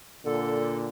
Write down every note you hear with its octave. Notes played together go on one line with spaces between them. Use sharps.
A#2 D3 A4